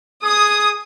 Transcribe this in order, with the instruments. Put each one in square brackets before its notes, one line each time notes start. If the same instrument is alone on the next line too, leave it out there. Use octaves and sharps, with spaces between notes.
[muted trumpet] G#4 [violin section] D#6